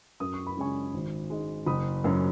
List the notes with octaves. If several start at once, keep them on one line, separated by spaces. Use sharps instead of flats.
F#2 D#6
C#6
B5
C#3 G#3 C#4 G#5 C#6
G#1
G#2 G#3
F#1 B5 D#6
F#2 F#3 C#4